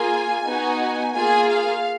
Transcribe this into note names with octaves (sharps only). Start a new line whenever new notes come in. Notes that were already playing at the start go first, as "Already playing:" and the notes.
Already playing: A#3 F4 G#4 G#5
B3 D#4 F#4
A#3 F4 G#4 G#5
F5